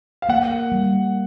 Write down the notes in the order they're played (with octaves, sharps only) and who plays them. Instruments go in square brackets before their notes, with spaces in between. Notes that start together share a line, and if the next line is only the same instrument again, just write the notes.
[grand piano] F5
[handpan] A#3 [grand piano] F#5
[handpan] G3